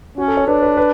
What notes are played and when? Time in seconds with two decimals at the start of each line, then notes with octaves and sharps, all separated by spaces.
0.18 C#4 F#4
0.28 A4
0.37 C#5
0.48 D4 B4
0.62 B4
0.77 B4